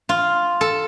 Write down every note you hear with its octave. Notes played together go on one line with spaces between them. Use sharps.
F4
A4